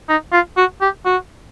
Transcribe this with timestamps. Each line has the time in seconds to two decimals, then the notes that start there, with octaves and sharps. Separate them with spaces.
0.09 D#4
0.33 F4
0.57 F#4
0.81 G4
1.05 F#4